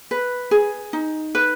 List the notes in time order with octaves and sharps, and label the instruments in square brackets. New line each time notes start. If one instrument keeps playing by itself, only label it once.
[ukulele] B4
G#4
D#4
B4